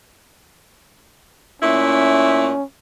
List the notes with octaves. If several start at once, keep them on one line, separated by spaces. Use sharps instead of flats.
A#2 A3 C#4 E4